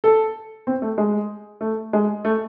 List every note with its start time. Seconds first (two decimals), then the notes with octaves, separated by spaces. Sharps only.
0.04 A4
0.67 C4
0.82 A3
0.98 G#3
1.61 A3
1.93 G#3
2.25 A3